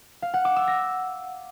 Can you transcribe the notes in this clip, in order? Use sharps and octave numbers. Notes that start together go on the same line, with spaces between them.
F5
F#5
D6
E6
A#6